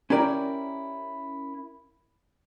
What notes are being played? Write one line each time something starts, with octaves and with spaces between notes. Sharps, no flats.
C#4 E4 G4 A#4 D5